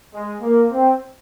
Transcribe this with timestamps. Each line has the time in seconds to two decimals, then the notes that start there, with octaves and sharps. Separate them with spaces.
0.13 G#3
0.41 A#3
0.71 C4